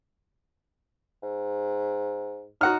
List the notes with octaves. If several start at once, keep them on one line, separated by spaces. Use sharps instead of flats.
G#2
D#4 F#4 F#5 F6